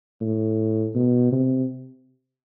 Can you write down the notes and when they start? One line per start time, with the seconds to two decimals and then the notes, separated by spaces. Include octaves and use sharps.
0.21 A2
0.95 B2
1.32 C3